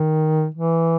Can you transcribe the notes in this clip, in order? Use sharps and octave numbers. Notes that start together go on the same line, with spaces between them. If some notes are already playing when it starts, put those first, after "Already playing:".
Already playing: D#3
E3